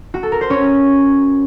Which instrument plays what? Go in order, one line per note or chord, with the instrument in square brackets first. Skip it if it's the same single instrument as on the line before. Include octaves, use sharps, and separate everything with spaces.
[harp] F#4
A4
A#4
C5
C#4 C#5